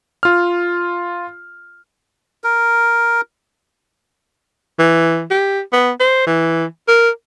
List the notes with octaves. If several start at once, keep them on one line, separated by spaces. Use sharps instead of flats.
F4 F6
A#4
E3
G4
B3
C5
E3
A#4